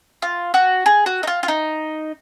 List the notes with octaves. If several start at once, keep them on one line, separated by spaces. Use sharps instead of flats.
F4
F#4
G#4
F#4
D#4
F4
F4
D#4